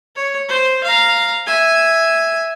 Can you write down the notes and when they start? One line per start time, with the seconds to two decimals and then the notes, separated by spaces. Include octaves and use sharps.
0.16 C#5
0.49 C5
0.84 F5 A#5
1.46 E5 G#5